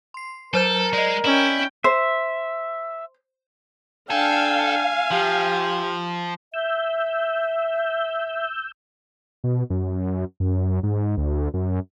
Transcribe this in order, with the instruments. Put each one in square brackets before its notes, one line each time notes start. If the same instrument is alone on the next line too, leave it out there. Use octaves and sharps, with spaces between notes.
[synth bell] C6 C7
[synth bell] F#3 C5 G6 [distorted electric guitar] A4 [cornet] A#4
[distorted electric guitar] G#3 [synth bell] D5 D#5
[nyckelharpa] C#4 G5 [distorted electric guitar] E4
[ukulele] C5 [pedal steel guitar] E5
[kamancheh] D4 G5 [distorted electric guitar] A4 [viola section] F5 [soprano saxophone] G#5
[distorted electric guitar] F3 [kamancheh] G4
[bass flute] E5 [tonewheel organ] E6 G6
[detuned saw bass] B2
F#2
F#2
G#2
D2
F#2